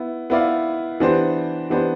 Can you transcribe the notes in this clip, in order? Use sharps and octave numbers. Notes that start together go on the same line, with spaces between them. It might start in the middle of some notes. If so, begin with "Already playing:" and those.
Already playing: B3 E4
B3 E4 B4 D5 F5
E3 B3 D4 G4 C5
E3 B3 D4 G4 C5